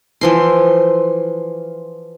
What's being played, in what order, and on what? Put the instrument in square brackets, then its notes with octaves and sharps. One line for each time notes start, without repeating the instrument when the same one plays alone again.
[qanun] E3 F3 C6